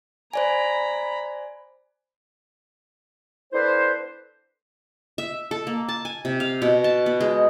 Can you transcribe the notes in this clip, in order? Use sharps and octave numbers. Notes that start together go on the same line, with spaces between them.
C5 D5 G#5 A#5 B5
B3 D4 E4 A4 B4 C5
E5
A4
A#3
A5
G#5
C3
F5
B2
A5
B3
G#3